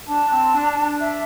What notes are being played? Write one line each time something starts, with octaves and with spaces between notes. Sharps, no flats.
D4 A5
D4
C4
D4
D4
E5